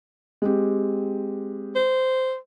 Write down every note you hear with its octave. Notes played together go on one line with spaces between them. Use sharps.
G#3 C4 G4
C5